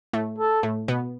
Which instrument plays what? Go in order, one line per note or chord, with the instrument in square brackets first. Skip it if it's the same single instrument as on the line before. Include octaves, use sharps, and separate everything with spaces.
[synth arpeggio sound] A2 A3
[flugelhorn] A4
[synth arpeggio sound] A2 A3
B2 B3